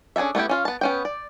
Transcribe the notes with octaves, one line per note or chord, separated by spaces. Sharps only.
C#4 D4 G#4 A4 E5
A3 B3 E4 G4
C#4 F4 F5
B3 A5
B3 C#4 G5
D5